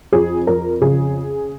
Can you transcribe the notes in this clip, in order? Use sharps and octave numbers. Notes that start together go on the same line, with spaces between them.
F2 G#4
F2 A#4
C#3 G#4